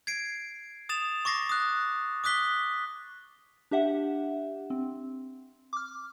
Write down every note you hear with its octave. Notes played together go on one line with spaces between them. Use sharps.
G#6 C7 D7
D#6 A6 E7 F7
C#6 D6 A6 A#6 C7
D#6 F#6
D6 D#6 F#6 B6 G7
D4 G4 E5 F#5
C4
D6 F6